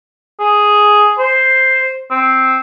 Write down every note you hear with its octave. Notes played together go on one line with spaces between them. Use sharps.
G#4
C5
C4